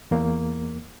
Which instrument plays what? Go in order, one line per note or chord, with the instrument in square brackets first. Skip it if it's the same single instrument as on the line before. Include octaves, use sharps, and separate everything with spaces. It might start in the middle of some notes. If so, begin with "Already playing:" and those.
[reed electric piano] E2 A#3